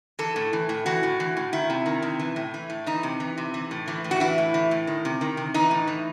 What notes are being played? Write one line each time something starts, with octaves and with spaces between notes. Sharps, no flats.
E3 A4
A2
E3
A2
E3 F#4
A2
E3
A2
D#3 E4
C3
D#3
C3
E3
A2
E3
A2
E3 D#4
C3
E3
C3
E3
A2
E3
A2
F#4
E3 E4
A2
E3
A2
D#3
C3
D#3
C3
E3 D#4
A2
E3